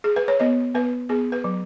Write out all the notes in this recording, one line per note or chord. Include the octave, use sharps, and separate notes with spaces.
G#4
B4
C#5
B3 D#5
B3 B4
B3 G#4
B4
F#3